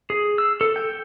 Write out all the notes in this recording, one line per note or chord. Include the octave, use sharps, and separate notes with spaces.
G#4
E6
A4
G5